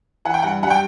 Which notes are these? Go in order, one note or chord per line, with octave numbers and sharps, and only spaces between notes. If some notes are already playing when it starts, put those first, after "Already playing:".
E3 F#5
G5
G2 F#5
G3 F#5
G5